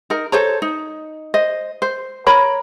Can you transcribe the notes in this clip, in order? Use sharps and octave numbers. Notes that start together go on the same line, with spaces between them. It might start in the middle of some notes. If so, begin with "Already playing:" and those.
D#4 A#4
A4 C5 C#5 A#5
D#4
C5 D#5
C5
A#4 C#5 A#5 B5